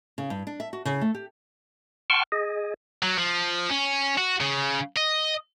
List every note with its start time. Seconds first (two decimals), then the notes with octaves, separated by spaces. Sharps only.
0.18 C#3
0.30 G2
0.47 D4
0.60 E5
0.73 F#4
0.85 C#3
1.01 A3
1.15 G4
2.10 F#5 G5 A5 C6 C#6 F6
2.32 G#4 D#5
3.03 F#3
3.18 F3
3.69 C#4
4.18 F#4
4.41 C#3
4.97 D#5